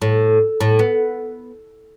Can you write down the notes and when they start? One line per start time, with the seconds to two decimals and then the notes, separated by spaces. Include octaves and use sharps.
0.02 A2
0.61 A2
0.79 B3